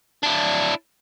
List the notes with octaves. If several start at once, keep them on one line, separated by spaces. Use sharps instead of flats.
D4 E4